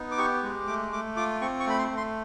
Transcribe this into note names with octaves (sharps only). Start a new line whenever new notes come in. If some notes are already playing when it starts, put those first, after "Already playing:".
Already playing: B3 D#4
D6
G4 C#6
G#3
A3 D6
A3 D6
F4 D6
C4 C#6
C#6
A3 B5
C6
A3
C6